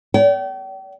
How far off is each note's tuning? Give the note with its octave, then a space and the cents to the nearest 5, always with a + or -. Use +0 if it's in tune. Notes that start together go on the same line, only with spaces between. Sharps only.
D5 -45 G5 -35